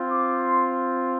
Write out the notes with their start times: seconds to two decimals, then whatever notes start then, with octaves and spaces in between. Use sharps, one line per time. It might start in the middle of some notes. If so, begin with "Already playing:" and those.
Already playing: C4 F4
0.10 D6
0.39 C6